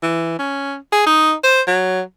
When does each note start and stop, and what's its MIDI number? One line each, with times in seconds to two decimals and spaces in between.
0.02 0.38 52
0.39 0.75 61
0.92 1.06 68
1.06 1.33 63
1.44 1.61 72
1.67 2.01 54